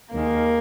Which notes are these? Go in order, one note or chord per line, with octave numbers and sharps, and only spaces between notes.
D#2 D#3 G#3 A#3